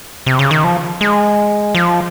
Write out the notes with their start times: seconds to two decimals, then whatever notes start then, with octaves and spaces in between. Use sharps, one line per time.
0.26 C3
0.39 C#3
0.51 D#3
0.64 F3
1.01 G#3
1.75 F3